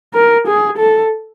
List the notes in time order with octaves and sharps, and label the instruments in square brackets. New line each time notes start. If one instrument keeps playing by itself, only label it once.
[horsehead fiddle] A#4
G#4
A4